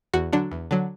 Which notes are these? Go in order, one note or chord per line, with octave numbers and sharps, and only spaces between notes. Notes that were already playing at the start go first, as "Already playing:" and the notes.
E2 F#4
D3 F#3 D4
E2
D3 F#3